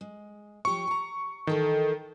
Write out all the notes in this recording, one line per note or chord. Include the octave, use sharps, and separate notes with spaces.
G#3
F3 G4 C#5 C#6
G#5 A#5
D#3 E3 A4 A#4